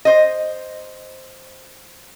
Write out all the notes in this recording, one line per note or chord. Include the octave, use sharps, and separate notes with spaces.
C5 D#5